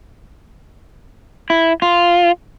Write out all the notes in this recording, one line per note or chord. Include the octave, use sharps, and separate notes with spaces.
E4
F4